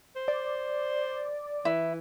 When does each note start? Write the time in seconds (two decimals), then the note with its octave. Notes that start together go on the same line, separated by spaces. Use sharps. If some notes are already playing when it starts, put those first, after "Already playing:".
0.16 C5
0.28 D5
1.65 E3 E4